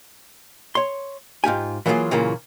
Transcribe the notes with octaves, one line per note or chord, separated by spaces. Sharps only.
C#5 C6
G#2 F4 G4 G#5
E3 F#3 A#3 D4 F4 G#4
A#2 C#3 E3 F#3 A#3 F4